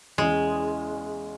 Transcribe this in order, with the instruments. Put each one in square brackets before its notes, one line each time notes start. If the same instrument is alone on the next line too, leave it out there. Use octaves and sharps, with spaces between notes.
[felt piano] E2 C#3 E3 [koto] G#3